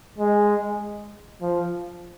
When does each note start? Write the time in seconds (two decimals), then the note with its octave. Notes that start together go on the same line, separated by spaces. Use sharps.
0.18 G#3
1.42 F3